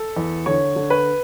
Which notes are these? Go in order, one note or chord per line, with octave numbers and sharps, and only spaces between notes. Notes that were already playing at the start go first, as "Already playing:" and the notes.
Already playing: A4
E2
D3 C#5
D3
B4